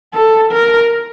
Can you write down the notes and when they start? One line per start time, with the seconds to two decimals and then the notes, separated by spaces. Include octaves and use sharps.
0.14 A4
0.52 A#4